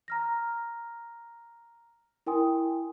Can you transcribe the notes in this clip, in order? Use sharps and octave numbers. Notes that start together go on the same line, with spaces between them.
A#5 F6 A#6
E4 A#4 G5 G#5 C6 D#6